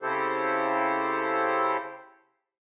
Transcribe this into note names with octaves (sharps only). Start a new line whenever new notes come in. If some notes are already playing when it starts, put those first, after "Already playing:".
C#3 C4 E4 G4 A4 C5